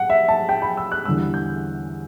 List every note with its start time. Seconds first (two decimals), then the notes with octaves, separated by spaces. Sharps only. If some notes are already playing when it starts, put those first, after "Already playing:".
Already playing: F#5
0.10 E5
0.28 A5
0.49 G5
0.62 B5
0.77 E6
0.92 F#6
1.05 E2 D3 G3 E6
1.34 G6